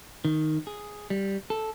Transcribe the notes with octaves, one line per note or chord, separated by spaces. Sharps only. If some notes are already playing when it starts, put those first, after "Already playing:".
D#3
G#4
G3
A4